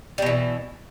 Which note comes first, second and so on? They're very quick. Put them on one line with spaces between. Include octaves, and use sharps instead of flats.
G3 B2 E3